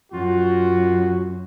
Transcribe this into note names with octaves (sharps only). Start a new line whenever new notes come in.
F#2 F4 F#4